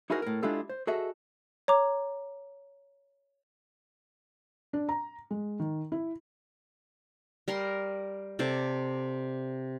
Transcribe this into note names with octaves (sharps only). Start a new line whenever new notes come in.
D#4 E4 F#4 G#4 A#4 C5
A2 A#4
G#3 D4 E4 F4 G4 A4
C5
F#4 G#4 A4 D#5 E5
C#5 A#5 D6
D4
A#5
G#3
D#3
E4
G3 A#4 A#5 C6
C3 A4 C5 D5